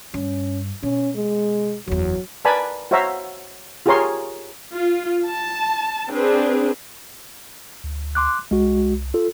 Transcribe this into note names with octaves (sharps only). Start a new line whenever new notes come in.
G2 C#4
B2 C#4
G#3
F#1 E2 F#3
A#4 B4 D5 G#5 A5 B5
F#4 C5 C#5 E5 F5 A#5
F4 G4 G#4 A#4 C#5 C6
F4
A5
C4 D4 G#4 B4
D2
C6 D6 F#6
C2 G#3 F#4
F4 A4